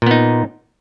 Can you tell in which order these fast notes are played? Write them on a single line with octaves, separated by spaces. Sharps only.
A#2 B3 D#4